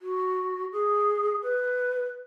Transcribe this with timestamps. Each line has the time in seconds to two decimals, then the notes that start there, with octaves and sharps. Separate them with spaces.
0.02 F#4
0.72 G#4
1.43 B4